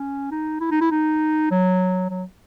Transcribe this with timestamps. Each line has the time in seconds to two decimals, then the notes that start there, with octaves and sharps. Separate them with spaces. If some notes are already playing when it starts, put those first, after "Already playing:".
Already playing: C#4
0.31 D#4
0.61 E4
0.71 D#4
0.81 E4
0.91 D#4
1.51 F#3
2.10 F#3